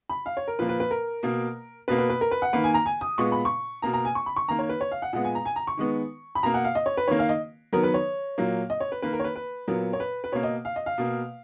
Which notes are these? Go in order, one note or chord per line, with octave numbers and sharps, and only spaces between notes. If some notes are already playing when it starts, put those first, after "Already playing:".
B5
F5
C#5
A#4
A#2 F3 A#3 B4
B4
B4
A#4
B2 A#3
B2 A#3 B4
B4
B4
A#4
B4
F#5
D#3 A#3 B4
G#5
A#5
G#5
D#6
A#2 G#3 B3 C#6
B5
C#6
B2 A#3 A#5
A#5
G#5
C#6
B5
C#6
D#3 A#3 A#5
C#5
B4
C#5
F5
F#5
A#2 G#3 B3 F#5
G#5
A#5
G#5
A#5
C#6
D#3 G#3 B3
B5
B2 A#3 A#5
F#5
F5
D#5
C#5
B4
D#3 A#3 C#5
F5
D#5
D#3 F#3 B3 A#4
B4
C#5
A#2 F#3 A#3
D#5
C#5
B4
D#3 A#3 B4
A#4
C#5
B4
B4
A#2 F#3 B3 A#4
C#5
B4
B4
B2 A#3 C#5
D#5
F5
D#5
F5
B2 A#3